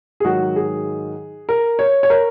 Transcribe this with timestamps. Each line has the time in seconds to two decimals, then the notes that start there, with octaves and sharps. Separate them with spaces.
0.20 G#4
0.24 G#2 D#3 F#3 F#4
0.56 G#4
1.49 A#4
1.79 C#5
2.03 C#5
2.10 A#4